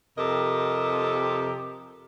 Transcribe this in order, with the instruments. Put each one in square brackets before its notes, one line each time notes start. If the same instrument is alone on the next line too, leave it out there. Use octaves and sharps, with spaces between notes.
[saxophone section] F2 C3 G4 A4 A#4 D#5